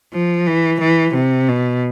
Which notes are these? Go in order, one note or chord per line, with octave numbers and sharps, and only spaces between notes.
F3
E3
E3
C3
B2